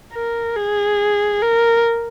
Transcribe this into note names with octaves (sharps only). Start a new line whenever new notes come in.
A#4
G#4
A#4